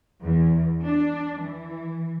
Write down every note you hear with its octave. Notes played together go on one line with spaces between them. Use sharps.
E2
D4
E3